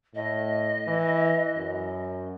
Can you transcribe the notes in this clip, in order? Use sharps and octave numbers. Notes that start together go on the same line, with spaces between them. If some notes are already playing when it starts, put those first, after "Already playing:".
A2 D#5
E3
F#2